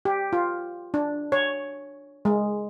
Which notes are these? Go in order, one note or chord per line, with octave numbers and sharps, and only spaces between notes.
G4
F4
D4
C#5
G#3